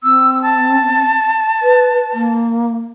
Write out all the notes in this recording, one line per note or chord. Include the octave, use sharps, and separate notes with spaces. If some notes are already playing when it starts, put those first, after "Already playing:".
C4 E6
A5
B4
A#3